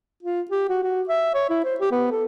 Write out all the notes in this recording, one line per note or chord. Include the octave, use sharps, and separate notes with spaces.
F4
G4
F#4
F#4
E5
C#5
E4
C5
G4
B3
A4